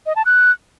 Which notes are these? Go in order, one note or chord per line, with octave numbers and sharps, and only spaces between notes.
D#5
A5
F#6